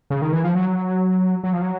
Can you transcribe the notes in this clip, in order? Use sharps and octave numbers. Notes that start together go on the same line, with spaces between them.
C#3
D#3
E3
F3
F#3
F#3
F3
F#3